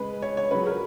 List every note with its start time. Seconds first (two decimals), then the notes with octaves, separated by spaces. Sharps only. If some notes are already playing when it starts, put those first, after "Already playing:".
Already playing: C#3 G#3 B4
0.22 C#5
0.37 C#5
0.51 C#3 F#3 B4
0.66 A#4